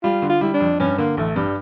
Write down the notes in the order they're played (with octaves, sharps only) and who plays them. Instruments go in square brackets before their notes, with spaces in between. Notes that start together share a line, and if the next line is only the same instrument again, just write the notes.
[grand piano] G3 [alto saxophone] F4
[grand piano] D3
[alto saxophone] F4
[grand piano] G3 [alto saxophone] E4
[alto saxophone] D4
[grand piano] F2
[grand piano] G2 [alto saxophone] C#4
[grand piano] D3 [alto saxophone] A#3
[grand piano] A1 [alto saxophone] A3
[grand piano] G2 [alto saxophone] G3